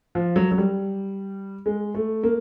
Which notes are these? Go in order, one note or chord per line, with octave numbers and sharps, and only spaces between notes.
F3
F#3
F#3
G3
G#3
A3
A#3